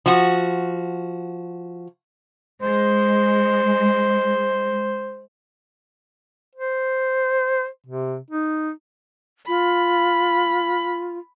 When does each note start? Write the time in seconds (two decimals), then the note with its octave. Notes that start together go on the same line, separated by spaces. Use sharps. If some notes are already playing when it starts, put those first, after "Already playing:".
0.06 F3 F#4
2.62 G#3 C5
6.56 C5
7.87 C3
8.31 D#4
9.48 F4 B5